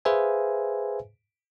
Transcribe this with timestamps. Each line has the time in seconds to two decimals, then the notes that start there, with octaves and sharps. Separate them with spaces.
0.05 G#4 B4 C5 E5 F5 G#5